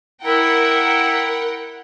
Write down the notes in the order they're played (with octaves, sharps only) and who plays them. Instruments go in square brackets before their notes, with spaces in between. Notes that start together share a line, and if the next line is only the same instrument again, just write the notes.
[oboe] E4 [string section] A#4 F#5 G5